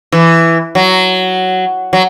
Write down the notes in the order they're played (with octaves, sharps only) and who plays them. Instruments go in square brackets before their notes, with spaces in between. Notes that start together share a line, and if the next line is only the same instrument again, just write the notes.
[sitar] E3
F#3
F#3